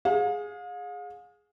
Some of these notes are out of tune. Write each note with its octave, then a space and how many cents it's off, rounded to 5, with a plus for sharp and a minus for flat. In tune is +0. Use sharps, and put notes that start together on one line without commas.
G#4 +0 F5 +40